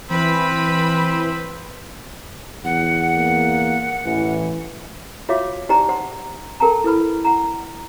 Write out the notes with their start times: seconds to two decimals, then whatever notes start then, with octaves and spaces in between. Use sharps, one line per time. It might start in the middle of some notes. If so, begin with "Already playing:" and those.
0.10 E3 C4 B4 B5
2.65 E2 F#5
3.17 A#3
4.05 A1 E3
5.29 F4 F#4 C#5 E5 F5 D6
5.69 D#4 G4 C5 D5 G5 A#5
5.88 C5 F#5 C6
6.60 A4 A#4 G5 A5 A#5
6.84 E4 A4 B4 B5
7.25 F#5 A#5